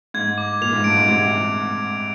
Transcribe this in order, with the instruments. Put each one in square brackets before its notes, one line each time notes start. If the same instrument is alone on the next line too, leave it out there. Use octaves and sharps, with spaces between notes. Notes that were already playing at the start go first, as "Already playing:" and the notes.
[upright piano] G#2 [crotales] G#6
[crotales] D6
[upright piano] A#2 [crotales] F7
[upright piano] G#2
[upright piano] G2 [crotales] D7
[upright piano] G#2
[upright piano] C3 [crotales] G#6